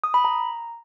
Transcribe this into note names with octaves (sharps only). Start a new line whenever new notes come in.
D#6
B5
A#5